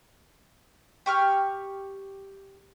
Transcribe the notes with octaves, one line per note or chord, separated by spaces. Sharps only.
G4 C#6 F6